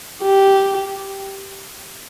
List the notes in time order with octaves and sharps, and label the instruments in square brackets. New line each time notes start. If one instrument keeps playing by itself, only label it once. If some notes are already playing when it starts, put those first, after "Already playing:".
[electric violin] G4